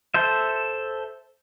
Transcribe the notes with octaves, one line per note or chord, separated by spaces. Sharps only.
A4 C5 E5